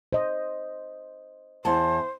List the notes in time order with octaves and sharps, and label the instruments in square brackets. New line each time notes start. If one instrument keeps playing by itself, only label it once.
[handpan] C5 D#5
[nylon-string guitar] E2 A5 [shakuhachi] C5